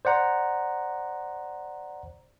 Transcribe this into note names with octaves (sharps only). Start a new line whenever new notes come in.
C5 D5 F#5 A#5